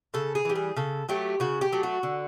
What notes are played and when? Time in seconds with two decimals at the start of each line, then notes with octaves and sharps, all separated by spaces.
0.14 C#3 A4
0.35 G#4
0.45 E3 G3
0.56 G#4
0.77 C#3 A4
1.09 F#3 A3 G4
1.40 C#3 F#4
1.61 G4
1.73 F#3 A3
1.83 F#4
2.03 D3